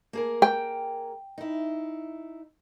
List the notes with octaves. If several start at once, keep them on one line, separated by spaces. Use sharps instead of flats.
A#3 G#4 A#4
G5
D#4 E4